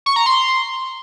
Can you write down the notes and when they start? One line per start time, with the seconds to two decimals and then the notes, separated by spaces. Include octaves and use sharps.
0.06 C#6
0.16 A#5
0.26 C6